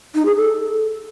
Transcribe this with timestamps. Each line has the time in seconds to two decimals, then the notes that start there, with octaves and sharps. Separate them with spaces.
0.15 D#4
0.25 G#4
0.36 A4